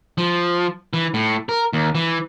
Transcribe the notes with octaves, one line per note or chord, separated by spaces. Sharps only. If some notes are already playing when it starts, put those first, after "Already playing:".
F3
E3
A2
A#4
D#2
E3